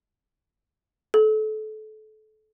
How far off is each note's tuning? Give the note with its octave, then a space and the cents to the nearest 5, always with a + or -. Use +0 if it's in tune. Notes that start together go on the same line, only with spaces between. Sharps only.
A4 -25